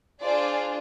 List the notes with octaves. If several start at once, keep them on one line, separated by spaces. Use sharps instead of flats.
D4 F4 G#4 C5 D5